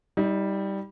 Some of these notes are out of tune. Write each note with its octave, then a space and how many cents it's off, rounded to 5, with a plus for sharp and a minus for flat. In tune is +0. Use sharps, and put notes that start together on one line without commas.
G3 +0 D#4 +35